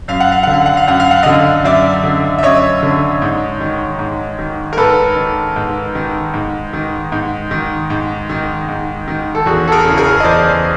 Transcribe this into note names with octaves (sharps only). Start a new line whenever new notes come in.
F#2 F5
F#5
F5
D3 F#5
F5
F#5
F5
F#2 F#5
F5
F#5
D3 D#5 F5
F#2 D5 E5
D3
E5
F#2 C#5 D#5
D3
G#2
D#3
G#2
D#3
A#4
G#2 A4 B4
D#3
G#2
D#3
G#2
D#3
G#2
D#3
G#2
D#3
G#2
D#3
A4
E2 F#4 G#4
A4
G#4 A#4
C#3 E3
G#4 A#4
D#5
E2 C5 D5